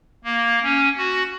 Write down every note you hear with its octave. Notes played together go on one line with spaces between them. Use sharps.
A#3
C#4
F#4